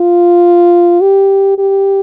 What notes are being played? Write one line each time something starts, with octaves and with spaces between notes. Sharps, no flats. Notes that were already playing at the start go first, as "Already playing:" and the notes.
Already playing: F4
G4
G4